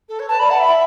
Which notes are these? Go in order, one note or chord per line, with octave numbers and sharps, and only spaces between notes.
A4
C#5
B4 A5
D5 B5
F#5 A5
E5 B5
E5